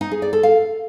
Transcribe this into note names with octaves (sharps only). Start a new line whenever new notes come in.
D#4
G#4
D5
A4
F5